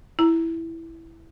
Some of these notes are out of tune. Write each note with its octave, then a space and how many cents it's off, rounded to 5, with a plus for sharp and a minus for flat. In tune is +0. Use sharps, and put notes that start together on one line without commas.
E4 +0 A#5 +0